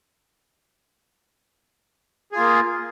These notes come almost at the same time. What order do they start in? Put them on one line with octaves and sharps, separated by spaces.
G#4 F4 A#3